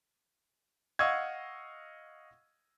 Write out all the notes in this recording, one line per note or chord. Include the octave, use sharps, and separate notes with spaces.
D#5 F5 F#5 C#6 E6 G#6